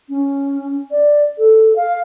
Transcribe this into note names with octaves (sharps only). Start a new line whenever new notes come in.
C#4
D5
A4
F5